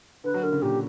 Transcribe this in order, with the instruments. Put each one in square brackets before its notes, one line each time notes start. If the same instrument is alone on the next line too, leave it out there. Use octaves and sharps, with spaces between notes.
[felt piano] D3 [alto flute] B4
[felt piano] F#3
[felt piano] D3 [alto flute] A#4
[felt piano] C#3
[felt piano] A#2 [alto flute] G4